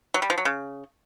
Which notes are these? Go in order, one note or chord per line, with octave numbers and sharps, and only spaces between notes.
F#3
G3
F3
F#3
C#3